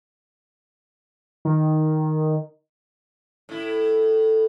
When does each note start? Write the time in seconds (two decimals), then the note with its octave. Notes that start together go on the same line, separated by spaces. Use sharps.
1.45 D#3
3.49 A2 E4